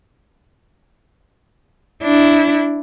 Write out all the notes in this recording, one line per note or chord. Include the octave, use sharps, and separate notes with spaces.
D4 E4